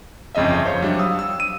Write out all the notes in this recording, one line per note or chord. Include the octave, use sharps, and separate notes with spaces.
G1 F2 C#3 D#5 E5
C5 C#5 F5
F#3 G3 D4
F5 D#6 E6
E6
D#7